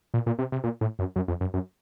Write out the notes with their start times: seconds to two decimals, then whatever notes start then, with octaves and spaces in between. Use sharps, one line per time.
0.14 A#2
0.26 A#2
0.39 C3
0.52 C3
0.64 A#2
0.81 A2
0.99 F#2
1.16 F#2
1.28 F2
1.41 F#2
1.54 F#2